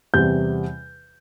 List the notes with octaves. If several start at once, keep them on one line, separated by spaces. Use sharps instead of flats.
E2 C3 G3 G6